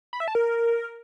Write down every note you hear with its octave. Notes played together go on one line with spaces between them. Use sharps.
B5
E5
A5
A#4